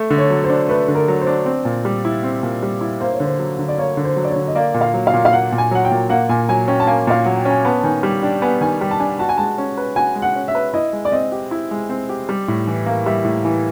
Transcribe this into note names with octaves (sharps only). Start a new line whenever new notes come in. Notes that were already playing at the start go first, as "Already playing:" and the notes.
Already playing: A3
D3
C#5
F#3
C5
D4
A3 B4
D3
A#4
F#3
C5
D4
C4
A#2
G3
E4
C4
A#2
G3
E4
A#3 C5
C#5
D3 C5
F#3
D3
D5
A#3 C#5
D3
C5
F#3
D5
C#5
D3
D#5
A#3 D5
A#2
F5
F#3
F5
A#2
F5
A#3 F#5
A#2
G#5
F#3 F#5
G5
A#2
A#3 F#5
A#2 G#5
F#3 G#5
C#4 G5
A5
A#3 G#5
A#2 F5
F#3 F#5
G5
C#4
G#5
B3 A5
A5
D#3 G#5
G3 G5
D4 G5
B3 G#5
D#3 G#5
G3 G5
A5
D4 G#5
F#4 A5
G#5
G#3 A5
C#4
B4
F#4 G#5
G#3
F#5
C#4
E5
B4
E4 D#5
G#3
D5
C4 D#5
G4
E4
G#3
C4
G4
G3
A2
E3
A#3
G3 E5
A2
E3